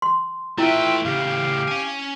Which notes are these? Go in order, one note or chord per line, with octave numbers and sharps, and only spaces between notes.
C6
A3 E4 F4 B4 E5 G5
A2 C#3 G4 F5
C#4 G#5